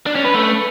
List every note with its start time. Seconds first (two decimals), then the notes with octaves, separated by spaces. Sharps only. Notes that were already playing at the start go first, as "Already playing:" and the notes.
0.06 D4
0.16 C#4
0.25 B4
0.34 A3